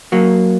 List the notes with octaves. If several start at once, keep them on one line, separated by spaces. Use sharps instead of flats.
F#3 A#3